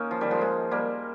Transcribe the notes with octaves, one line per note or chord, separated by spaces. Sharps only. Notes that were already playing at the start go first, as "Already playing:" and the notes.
Already playing: A#3 C#4 D#4
F3
D#3 G3
F3 G#3
F3 G#3
G3 A#3